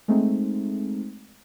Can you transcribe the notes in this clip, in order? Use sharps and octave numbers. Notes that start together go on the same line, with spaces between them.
G#3 A3 C4 D#4